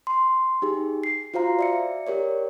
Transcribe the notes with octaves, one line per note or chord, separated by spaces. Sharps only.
C6
D#4 G4 G#4
C7
F4 F#4 C5 F5 A#5
D5 E5 C#7
G4 A#4 C#5 D5